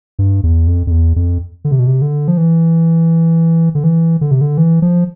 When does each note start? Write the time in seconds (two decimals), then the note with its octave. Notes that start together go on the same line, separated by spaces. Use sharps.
0.19 G2
0.43 E2
0.67 F2
0.87 F2
0.91 E2
1.16 F2
1.65 D3
1.71 C3
1.79 B2
1.87 C3
2.02 D3
2.28 F3
2.37 E3
3.75 D3
3.84 E3
4.21 D3
4.31 C3
4.41 D3
4.58 E3
4.82 F3